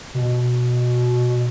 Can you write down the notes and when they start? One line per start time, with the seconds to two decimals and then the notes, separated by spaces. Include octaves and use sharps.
0.14 B2